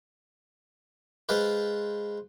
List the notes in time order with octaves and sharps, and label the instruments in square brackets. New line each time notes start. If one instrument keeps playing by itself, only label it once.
[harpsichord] G#3 F4 B4 C5